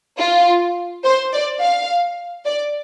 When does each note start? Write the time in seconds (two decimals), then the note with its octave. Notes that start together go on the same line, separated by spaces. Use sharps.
0.19 F4
1.04 C5
1.32 D5
1.61 F5
2.45 D5